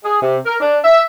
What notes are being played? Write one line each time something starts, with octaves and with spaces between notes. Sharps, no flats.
G#4
C3
A#4
D4
E5